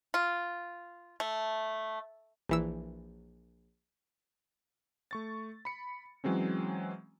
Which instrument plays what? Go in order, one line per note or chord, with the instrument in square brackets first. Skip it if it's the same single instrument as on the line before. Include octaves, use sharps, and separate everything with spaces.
[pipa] F4
A3
[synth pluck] A#1 E3 E6
[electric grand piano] A3 C#6 A6
B5 C#7
E3 F#3 G#3 C4 C#4